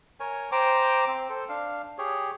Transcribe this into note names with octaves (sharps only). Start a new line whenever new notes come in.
A#4 C#5 G#5
C5 G5 A#5 D6
C4
A4 C5
D4 F5
G4 G#4 C#5